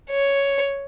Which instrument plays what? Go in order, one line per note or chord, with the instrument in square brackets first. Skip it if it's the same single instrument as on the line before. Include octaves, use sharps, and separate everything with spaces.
[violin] C#5